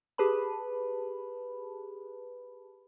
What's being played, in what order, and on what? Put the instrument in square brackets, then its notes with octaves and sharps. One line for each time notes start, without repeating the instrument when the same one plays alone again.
[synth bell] G4 G#4 B4 A5 B5